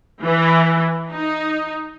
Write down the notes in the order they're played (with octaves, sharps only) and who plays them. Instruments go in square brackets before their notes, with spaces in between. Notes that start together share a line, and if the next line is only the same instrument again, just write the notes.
[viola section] E3
D#4